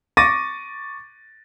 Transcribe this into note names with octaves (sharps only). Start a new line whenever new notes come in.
C#6 D6 A6 A#6 D#7